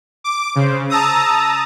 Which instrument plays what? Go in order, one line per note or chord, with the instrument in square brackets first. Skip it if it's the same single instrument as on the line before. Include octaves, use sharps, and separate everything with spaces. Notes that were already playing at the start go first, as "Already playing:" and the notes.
[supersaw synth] D6
[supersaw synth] C#3 [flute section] C5
[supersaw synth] A5 A#5 D#6 [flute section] E6